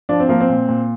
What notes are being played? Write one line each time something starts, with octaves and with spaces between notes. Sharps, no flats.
F3 D4
C4
F3 A#3
C4
A#2
A#2